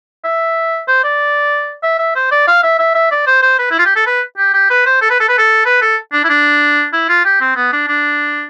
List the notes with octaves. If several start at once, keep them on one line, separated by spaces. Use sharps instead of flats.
E5
C5
D5
E5
E5
C5
D5
F5
E5
E5
E5
D5
C5
C5
B4
E4
F4
G4
A4
B4
G4
G4
B4
C5
A4
B4
A4
B4
A4
B4
A4
D4
E4
D4
E4
F4
G4
C4
B3
D4
D4